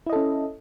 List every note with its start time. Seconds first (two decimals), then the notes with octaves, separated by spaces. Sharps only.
0.06 E4
0.10 D#5
0.13 A4
0.16 C#4